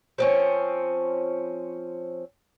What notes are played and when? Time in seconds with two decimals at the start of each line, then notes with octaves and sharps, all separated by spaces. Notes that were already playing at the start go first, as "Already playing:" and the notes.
0.18 F3 C4 C#4